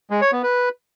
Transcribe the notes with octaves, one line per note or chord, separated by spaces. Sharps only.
G#3
C#5
B3
B4